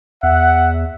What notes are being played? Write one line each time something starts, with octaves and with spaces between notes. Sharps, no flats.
E2 E5 F#5